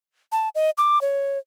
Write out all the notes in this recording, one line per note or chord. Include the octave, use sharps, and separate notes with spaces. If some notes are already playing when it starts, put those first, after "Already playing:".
A5
D#5
D6
C#5